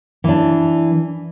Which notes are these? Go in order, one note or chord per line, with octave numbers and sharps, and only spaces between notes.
E3 D4